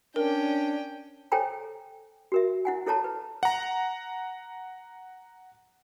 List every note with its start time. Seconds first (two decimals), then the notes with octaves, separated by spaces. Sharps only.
0.16 C#4 D4 A#4 G5
1.32 A4 C5 C#5 G5 G#5 A#5
2.32 F#4 A#4 E5
2.65 E4 F#5 G#5
2.87 E4 A4 C#5 A5 A#5
3.04 B4
3.43 F#5 A#5